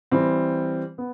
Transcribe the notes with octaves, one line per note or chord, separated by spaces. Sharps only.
E3 G3 C4
B3